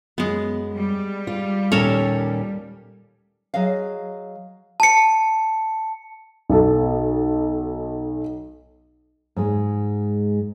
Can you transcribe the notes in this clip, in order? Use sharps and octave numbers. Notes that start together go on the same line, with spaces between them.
F#2 G#3 B3
G3
F4
D#2 A#2 C#4 A4 A#4 C#5
F#3 G#4 D#5 F5
A5 C#7
B1 A4
G#2 G#3